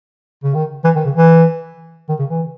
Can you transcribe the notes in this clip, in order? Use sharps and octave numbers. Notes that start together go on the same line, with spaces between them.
C#3
D#3
E3
D#3
C#3
E3
D#3
C#3
E3